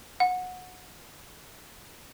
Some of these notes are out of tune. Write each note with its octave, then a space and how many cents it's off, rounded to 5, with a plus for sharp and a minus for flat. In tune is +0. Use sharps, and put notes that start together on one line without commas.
F#5 -20